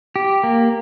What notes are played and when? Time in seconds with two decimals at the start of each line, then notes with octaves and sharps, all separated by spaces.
0.16 G4
0.43 A#3